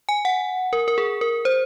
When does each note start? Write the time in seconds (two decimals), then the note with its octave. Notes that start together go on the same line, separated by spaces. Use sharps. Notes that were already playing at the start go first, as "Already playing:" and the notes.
0.09 G#5
0.25 F#5
0.73 A#4
0.88 A#4
0.98 G#4
1.21 A#4
1.45 C5